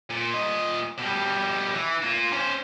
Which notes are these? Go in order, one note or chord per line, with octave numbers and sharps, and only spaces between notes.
A#2
A#2 D#5
B2 G3
E3
A#3 F4
C#4 C5